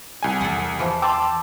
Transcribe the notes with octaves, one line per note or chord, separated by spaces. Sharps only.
C2 G#5
E2 A4 F#5
E3 F3
G5 A5 C6 D6 E6